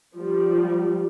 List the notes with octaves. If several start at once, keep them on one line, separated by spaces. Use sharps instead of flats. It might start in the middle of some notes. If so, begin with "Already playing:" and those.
F3 G3